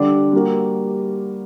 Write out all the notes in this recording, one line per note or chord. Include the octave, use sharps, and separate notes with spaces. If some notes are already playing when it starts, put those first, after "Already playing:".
Already playing: D3 G3 D4 G4
G3 A#3 F#4